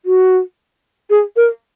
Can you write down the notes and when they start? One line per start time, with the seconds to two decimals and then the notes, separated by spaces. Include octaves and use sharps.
0.05 F#4
1.10 G#4
1.36 A#4